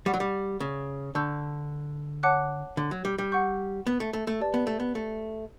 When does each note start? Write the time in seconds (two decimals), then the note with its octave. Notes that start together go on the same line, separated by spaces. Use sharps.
0.06 G3 D5 F#5 C#6
0.14 F#3
0.20 G3
0.60 C#3
1.15 D3 D5 A5 C#6 E6 G6
2.23 C#5 F#5 A5 D6 F#6
2.77 D3
2.91 F#3
3.05 G3
3.18 G3
3.32 F#5 C#6 G6
3.87 B3
4.00 A3
4.13 A3
4.27 A3
4.40 G4 B4 D5 A5
4.54 B3
4.67 A3
4.80 B3
4.95 A3